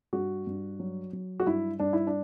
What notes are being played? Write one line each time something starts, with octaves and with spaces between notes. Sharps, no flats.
G2 F#4
G2
F#3
F#3
F#4
G2 E4
G2 D4
E4
D4